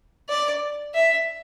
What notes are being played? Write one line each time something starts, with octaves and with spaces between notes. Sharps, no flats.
D5
E5